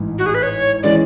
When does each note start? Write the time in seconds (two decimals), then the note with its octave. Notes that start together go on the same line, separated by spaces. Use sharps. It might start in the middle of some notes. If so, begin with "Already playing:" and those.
Already playing: A1 G#2 E3
0.19 F#4
0.26 G#4
0.35 B4
0.43 C#5
0.83 E3 G#3 C#4 D5